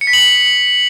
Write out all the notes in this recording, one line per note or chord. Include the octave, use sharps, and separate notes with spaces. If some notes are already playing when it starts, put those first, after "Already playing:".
C#7
B6
F#7